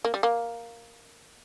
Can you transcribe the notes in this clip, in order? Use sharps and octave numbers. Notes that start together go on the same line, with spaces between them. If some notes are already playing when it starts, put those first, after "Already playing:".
A#3
G3
A#3